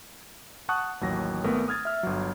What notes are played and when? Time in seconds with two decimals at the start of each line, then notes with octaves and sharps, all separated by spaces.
0.69 F#5 A5 C#6 D#6 F#6
1.01 A1 D#2 F#3 A#6
1.44 G#1 A3 B3 A#4
1.68 D#6 F6 G#6 A6
1.85 E5 F6
2.03 G1 F#3